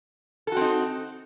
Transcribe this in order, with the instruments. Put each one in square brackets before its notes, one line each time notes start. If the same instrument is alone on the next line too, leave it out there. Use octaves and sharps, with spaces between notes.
[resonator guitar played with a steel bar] A4
F#4
C4
D#4